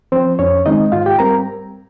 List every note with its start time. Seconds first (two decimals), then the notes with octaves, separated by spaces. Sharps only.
0.12 F3 C4 C5
0.39 F2 C#4 C#5
0.66 D#3 G#3 C4 D#4 D#5
0.92 G#2 F4 F5
1.06 G4 G5
1.19 G3 C4 A#4 A#5